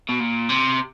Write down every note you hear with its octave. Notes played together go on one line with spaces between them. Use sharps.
B2
A#2
C3